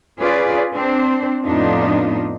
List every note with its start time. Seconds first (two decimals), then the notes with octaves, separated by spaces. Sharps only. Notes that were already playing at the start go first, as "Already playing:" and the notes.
0.19 C#4 F4 G#4 B4 D5
0.73 C4 D4 C5
1.44 F2 A2 B3 D4 D#4 F4